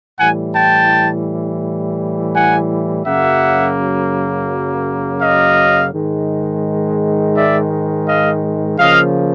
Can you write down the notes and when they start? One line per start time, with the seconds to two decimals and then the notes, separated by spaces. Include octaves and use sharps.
0.19 A2 E3 G3 F#5 G#5
0.55 G5 A5
2.34 F#5 G#5
3.05 F#2 C#3 F#3 A#3 E5 F#5
5.21 D#5 F5
5.92 G#2 D#3 G#3
7.36 D5 E5
8.07 D#5 F5
8.79 C#3 F3 A#3 D#5 F5